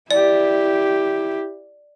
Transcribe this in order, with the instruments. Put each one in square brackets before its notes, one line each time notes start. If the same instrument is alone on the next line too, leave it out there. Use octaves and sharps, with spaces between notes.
[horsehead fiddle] E4 G4 [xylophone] D5